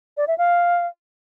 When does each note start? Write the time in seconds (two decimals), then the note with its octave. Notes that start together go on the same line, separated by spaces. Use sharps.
0.17 D5
0.28 E5
0.38 F5